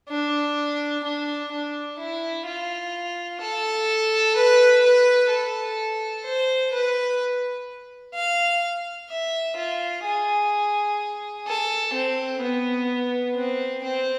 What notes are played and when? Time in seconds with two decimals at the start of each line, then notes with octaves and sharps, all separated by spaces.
0.09 D4
1.04 D4
1.51 D4
1.99 E4
2.46 F4
3.41 A4
4.36 B4
4.83 B4
5.31 A4
6.25 C5
6.73 B4
8.14 F5
9.10 E5
9.57 F4
10.05 G#4
11.47 A4
11.94 C4
12.41 B3
13.35 C4
13.84 C4